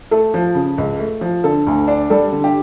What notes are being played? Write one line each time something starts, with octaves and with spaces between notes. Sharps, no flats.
A3 A4
F3
C#3
C#2
A3
F3
D3 A4
D2
D4
G3 A4
D3
G4